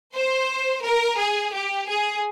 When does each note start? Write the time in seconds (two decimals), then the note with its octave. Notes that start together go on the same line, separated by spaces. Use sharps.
0.15 C5
0.84 A#4
1.19 G#4
1.54 G4
1.89 G#4